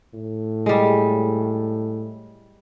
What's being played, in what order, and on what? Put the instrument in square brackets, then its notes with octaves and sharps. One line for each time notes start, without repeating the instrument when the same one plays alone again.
[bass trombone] A2
[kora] G3 G#3